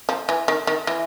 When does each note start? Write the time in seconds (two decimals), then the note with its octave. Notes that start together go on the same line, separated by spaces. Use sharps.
0.09 F3
0.29 E3
0.48 D#3
0.67 D#3
0.87 E3